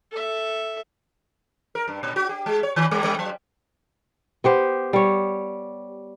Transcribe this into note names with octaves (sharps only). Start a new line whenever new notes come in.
A4 E5
A#4
G2
A#2
F#4
G4
G#3
C#5
D#3
G3
G3
F#3
B3 G4 C5
G3 C#5